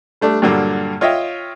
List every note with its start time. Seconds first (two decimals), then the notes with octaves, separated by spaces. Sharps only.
0.21 G3 A3 D4
0.42 G2 A#2 D3 F#3 A#3
1.01 F4 C#5 D#5 E5 G5